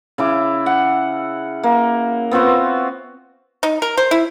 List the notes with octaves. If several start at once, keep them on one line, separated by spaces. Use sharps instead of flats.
C#3 E4 D6
F#5
A#3
B3 C4 F4 F#4
D#4
A#4
C5
E4